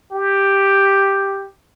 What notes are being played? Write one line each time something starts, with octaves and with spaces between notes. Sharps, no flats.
G4